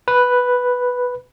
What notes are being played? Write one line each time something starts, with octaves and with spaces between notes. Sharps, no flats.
B4